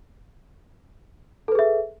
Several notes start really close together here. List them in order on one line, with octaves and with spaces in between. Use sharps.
A4 B4 G#4 E5